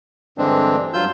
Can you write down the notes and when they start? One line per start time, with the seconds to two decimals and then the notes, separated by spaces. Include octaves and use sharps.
0.38 G2 D3 E3 G#3 C4 D4
0.93 G2 F#3 F4 E6 G6